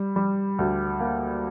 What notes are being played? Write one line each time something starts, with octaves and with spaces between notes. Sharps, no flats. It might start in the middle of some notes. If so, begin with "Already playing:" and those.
Already playing: G3
G3
D2
A#3